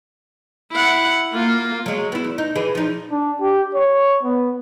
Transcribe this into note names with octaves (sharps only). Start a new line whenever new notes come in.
E4 F#5
A#3 F4
F#3 G#3
B3 E4
E2
D#4
E3 G#4
F3 D#4
D4
G4
C#5
B3